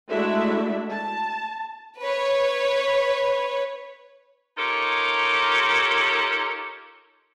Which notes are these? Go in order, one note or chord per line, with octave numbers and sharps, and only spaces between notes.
G#3 A3 D4 E4 F#4 E5
A5
B4 C#5
D#4 F4 G4 A4 A#4 C#5